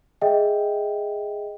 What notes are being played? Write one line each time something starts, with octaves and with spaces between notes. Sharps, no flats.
G#4 D#5 E5 G5